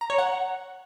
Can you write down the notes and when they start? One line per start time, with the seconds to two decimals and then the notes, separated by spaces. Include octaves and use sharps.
0.01 A#5
0.10 C#5
0.18 F#5